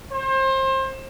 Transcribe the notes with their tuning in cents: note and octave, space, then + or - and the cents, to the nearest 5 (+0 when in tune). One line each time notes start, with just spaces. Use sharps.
C5 +30